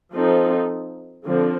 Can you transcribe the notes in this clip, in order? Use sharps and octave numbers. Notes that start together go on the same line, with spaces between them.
F3 C4 D#4 A4
D3 F3 C4